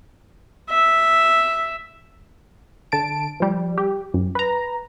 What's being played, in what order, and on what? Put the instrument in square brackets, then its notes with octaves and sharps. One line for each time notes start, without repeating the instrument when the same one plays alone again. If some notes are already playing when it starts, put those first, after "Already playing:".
[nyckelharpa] E5
[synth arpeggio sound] D3 A5 D7
F3 G3
G4
F#2
B4 A#5